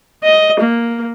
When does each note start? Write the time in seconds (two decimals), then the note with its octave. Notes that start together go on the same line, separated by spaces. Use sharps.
0.24 D#5
0.60 A#3